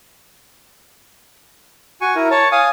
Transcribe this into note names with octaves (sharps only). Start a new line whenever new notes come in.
F#4 G#5 C#6
E4 A#4
C#5 A5
F5 G#5 D#6